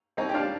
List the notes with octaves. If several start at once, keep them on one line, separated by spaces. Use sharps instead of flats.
C2 C4 D#4
G4
D4 F4
G3